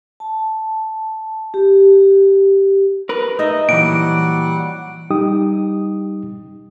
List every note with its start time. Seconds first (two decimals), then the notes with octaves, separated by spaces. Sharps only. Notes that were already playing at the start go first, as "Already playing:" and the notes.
0.20 A5
1.54 G4
3.09 A#4 B4
3.39 D#4 D#5 E5
3.69 A#2 E3 F#3 G3 F#5 D7
5.10 G3 D#4 G4 G5 D#6